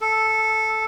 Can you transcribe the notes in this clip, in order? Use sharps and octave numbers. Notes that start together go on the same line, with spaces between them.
A4